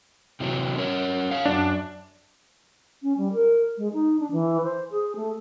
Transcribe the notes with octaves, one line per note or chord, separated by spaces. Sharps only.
C3 E3 F#3
C#4 A#4 C#5
C#5 F5
F#2 D4
C#4
G3
A#4
G#3
D#4
D4
E3
C5
G#4
A3